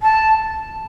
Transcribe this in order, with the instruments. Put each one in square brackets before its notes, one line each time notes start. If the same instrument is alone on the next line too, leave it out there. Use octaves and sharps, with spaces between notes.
[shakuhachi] A5